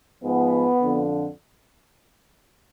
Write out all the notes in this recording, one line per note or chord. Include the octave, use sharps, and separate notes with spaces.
G#2 F3 B3
F2 D3 F3